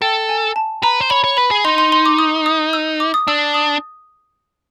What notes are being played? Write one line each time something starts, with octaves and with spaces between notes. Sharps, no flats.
A4 G5
G#5
A5
B4 A#5
C5
C#5 B5
C#5
B4 B5
G#4
D#4 C6
C6
C6
D6
D#6
D#6
E6
D6
D#6
D4 E6
D#6